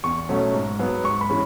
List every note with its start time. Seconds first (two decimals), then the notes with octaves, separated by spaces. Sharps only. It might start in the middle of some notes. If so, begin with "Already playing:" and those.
0.04 E2 C#6
0.29 B2 F#3 A3 C#4
0.54 G#2
0.79 F#3 B3
1.04 G#2 C#6
1.21 B5
1.29 E3 G#3 C#4